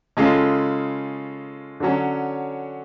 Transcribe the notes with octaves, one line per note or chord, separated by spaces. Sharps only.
C#3 G#3 C#4 F4 A4
D3 F#3 C#4